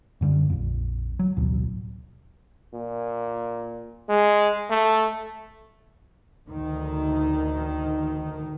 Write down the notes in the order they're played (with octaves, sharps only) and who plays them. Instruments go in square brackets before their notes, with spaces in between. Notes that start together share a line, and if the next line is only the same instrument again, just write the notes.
[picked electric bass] F#2 D3 G3
A#1 F2
F#3
A1 D2 B2 F#3
[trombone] A#2
G#3
A3
[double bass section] D2 D#3